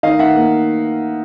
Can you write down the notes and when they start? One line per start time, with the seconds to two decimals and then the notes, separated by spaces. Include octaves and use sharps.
0.03 D#3 D#5 F5
0.19 D#3 E5 F#5
0.36 A#3